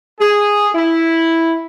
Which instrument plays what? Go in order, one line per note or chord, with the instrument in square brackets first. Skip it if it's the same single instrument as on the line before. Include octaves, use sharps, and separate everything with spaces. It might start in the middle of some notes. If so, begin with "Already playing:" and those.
[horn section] G#4
E4